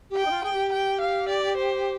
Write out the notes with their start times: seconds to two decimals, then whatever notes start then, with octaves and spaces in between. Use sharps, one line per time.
0.10 G4
0.17 G5
0.25 D#4
0.30 F4
0.43 G#4 G5
0.52 G4
0.72 G5
1.01 F5
1.29 D5
1.57 C5